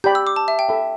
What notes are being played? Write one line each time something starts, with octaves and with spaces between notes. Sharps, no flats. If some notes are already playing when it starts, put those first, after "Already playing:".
G4 D5 G5 B5 G6
E6
D6
A5
E5
G5
A4 E5 B5